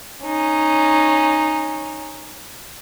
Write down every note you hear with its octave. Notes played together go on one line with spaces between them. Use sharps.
C#4 D#4